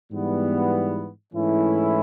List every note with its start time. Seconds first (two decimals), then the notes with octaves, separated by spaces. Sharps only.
0.12 G#2 E3 G3 B3
1.33 G#2 E3 A3 C#4 E4